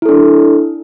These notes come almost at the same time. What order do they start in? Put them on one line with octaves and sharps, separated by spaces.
E4 A4 D4